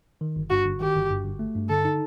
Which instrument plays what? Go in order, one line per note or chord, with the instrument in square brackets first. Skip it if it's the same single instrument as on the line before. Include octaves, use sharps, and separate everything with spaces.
[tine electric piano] D#3
G1
[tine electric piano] G2 [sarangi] F#4
[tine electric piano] G1
[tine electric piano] D#3 [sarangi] G4
[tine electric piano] G1
G2
G1
A3
G2
[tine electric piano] D3 [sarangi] A4
[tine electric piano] D#4